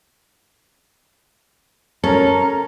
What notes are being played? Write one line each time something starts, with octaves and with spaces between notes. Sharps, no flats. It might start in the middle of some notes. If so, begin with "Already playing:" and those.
C#4 A4 A#4 A#5